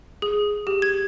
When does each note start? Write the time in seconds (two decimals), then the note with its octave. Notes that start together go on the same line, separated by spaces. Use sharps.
0.22 G#4
0.67 G4
0.82 G#6